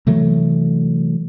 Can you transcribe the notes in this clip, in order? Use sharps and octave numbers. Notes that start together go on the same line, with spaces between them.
C3 E3 F#3 A3